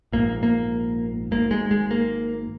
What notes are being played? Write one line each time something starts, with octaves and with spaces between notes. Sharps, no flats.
A#1 G#2 A#3
A#3
G#1 G#2 A#3
G#3
G#3
A#3